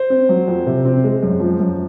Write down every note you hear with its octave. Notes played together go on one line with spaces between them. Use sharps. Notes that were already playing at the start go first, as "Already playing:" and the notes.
Already playing: C5
C4
F#3
F2
C3
C4
G#3
F#2
F3
F#2